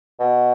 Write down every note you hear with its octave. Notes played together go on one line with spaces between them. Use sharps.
B2